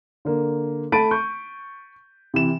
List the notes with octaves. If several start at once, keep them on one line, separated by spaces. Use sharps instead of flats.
D3 A#3
A3 A5 B5 A6 D7 D#7
C#6 G6
C3 E3 E7